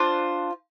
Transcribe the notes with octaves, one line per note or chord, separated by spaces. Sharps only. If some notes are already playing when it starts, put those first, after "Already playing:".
Already playing: D4 F4 C5